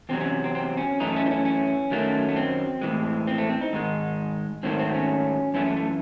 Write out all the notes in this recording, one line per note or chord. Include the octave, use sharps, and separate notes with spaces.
E2 C3 F#3 C4
C#4
C4
C4
C#4
F#2 E3 A3 D#4
C#4
D#4
C#4
C#4
F#2 D#3 F#3 A3
A3
C4
A2 E3 G#3
C4
A3
C4
D#4
G#2 D#3 G#3
G#2 D#3 F#3 A3 C4
C4
C#4
F#2 E3 A3 C#4
A3
A3